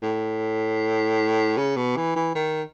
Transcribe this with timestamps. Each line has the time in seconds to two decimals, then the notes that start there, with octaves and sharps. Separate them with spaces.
0.03 A2
1.58 C#3
1.77 B2
1.97 E3
2.16 E3
2.35 D#3